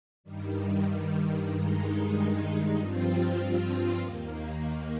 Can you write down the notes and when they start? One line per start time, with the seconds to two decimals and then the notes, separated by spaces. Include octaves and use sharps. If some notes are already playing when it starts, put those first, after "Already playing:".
0.24 G2 D#3 G3
1.49 G2 D#3 G#3 D#4
2.74 G2 F3 C4 F4
3.99 D#2 D#3 A#3